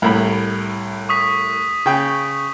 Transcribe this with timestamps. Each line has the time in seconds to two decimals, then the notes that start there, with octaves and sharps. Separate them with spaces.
0.02 C2 A2 B5
1.09 C#6 D#6 B6
1.86 C#3 G5